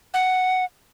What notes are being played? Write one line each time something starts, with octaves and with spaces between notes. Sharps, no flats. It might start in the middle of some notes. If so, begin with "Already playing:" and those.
F#5